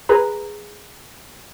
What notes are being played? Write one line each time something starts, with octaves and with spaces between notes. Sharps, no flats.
G#4 B4 A#5